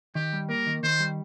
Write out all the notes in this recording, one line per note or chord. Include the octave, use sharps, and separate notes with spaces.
D#3 G4
G3
A#3 A#4
D#3
D#3 C5
G3